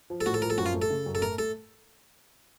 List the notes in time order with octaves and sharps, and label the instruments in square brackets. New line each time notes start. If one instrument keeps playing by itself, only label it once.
[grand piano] F3
[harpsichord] A4
[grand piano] A2 [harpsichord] F#4
[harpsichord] A4
[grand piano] F3 [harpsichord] A#4
[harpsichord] A4
[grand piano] F#2 [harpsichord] F#4
[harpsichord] F4
[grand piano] A3
[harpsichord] A4
[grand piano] C#3
F#2
[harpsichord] A4
[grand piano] A3 [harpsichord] A#4
[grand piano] A3 [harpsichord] A4